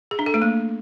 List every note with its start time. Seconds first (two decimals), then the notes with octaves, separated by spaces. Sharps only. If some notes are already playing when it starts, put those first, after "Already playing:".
0.11 G#4
0.19 D4
0.26 A4
0.34 A3
0.42 A#3